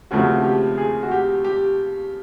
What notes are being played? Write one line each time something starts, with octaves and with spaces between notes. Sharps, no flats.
D#2 C#3 F3 A3 C4 F#4
G4
G#4
F#4
G4
G4